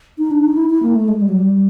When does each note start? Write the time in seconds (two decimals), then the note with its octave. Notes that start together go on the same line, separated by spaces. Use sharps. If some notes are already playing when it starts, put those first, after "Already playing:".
0.18 D#4
0.31 D4
0.44 D#4
0.57 E4
0.70 E4
0.83 A#3
0.95 A3
1.08 G#3
1.21 G3
1.29 F#3
1.36 G3